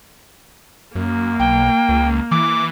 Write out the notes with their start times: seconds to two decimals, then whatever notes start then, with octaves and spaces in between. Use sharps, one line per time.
0.95 F#2 A#3
1.39 B1 G5
1.89 C#2
2.31 E3 D6